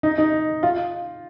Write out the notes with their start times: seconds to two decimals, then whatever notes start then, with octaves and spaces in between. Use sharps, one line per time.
0.03 D#4
0.18 D#4
0.63 F4